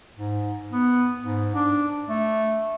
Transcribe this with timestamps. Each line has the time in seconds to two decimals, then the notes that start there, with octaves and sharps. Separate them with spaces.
0.17 G#2
0.72 B3
1.21 G#2
1.55 D4
2.09 A3